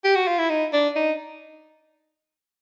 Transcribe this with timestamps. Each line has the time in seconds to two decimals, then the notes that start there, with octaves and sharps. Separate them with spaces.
0.05 G4
0.15 F#4
0.28 F4
0.39 E4
0.49 D#4
0.73 D4
0.96 D#4